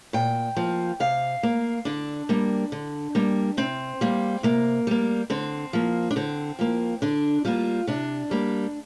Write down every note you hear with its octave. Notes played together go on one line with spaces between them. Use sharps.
A#2 G5
F3 A#3
C3 F5
A#3
D3 D4
G3 A#3
D3
G3 A#3
C3 C4
G3 A#3
C3 A#3
G3 A#3
D3 C4
F3 A#3
D4
D3 C4
F3 A#3
D3 D4
G3 A#3 F4
C3 D4
G3 A#3